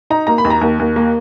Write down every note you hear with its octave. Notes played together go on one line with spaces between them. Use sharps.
D#4 A#5
A#3 A#5
B5
D#2
A#5
D#2
D#2
A#3